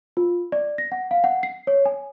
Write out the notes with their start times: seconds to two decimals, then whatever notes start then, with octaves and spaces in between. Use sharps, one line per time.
0.17 F4
0.52 D5
0.78 A#6
0.92 F#5
1.11 F5
1.24 F#5
1.43 C7
1.67 C#5
1.86 G#5